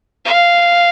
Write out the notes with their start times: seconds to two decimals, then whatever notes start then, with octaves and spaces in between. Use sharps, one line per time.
0.25 F5